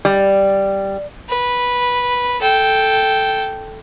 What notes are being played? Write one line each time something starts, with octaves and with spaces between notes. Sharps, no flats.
G3
B4
A4 G5